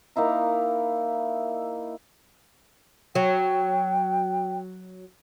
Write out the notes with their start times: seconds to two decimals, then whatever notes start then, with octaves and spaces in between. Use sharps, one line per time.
0.16 A#3 D#4 E4 A#5
3.15 F#3 G5